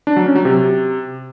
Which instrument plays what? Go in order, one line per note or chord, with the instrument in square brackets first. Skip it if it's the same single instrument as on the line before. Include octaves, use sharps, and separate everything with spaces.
[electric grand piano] D4
F#3
C#4
F#3
C3